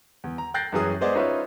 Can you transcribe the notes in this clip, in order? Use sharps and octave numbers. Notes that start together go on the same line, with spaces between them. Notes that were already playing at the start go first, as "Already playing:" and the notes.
E2
A#5
G5 F#6 G6 A6 A#6 C7
F#2 E3 F#3 G#4 D#6
G#3 B3 G#4 C5 D5 D#5
C#4 D#4 F4 B4 C#5 E5